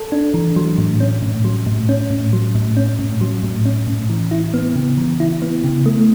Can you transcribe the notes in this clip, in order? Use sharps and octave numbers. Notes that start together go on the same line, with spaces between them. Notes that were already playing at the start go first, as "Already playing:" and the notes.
Already playing: A4
D4
E3
F#3
A2
C#4
A2
F#3
A2
C#4
A2
F#3
A2
C#4
A2
F#3
A2
C#4
A2
E3
E4
B3
C#3
E3
E4
B3
C#3
A3